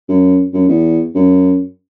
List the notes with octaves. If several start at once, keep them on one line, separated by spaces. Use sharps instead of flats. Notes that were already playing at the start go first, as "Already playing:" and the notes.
F#2
F#2
E2
F#2